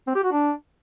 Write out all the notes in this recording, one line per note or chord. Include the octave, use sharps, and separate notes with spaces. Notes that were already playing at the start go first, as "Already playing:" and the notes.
C4
G4
F#4
D4